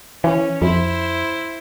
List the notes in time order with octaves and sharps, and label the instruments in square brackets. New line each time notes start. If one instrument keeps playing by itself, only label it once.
[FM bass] E3 [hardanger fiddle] C#4
[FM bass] F2 [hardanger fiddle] E4 C5